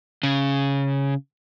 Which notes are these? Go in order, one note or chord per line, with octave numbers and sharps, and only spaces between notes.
C#3